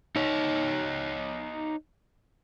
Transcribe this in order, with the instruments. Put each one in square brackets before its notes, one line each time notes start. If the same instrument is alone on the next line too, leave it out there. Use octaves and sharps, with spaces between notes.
[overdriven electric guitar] D#4 C#5